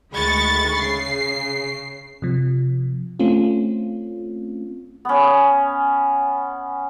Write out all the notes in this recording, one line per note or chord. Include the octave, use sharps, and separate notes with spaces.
D2 D#3 G#3 B5 C#6 A6
C#3 C7
C3 F3
A3 C4 C#4 F4
B3 C#4